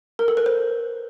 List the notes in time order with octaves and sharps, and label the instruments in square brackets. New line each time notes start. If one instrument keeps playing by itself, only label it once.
[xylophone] A#4
A4
B4
C5